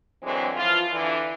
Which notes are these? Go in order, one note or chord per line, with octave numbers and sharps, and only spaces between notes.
D3 E3 F#3 G#3 C4
E3 F3 F4
D3 E3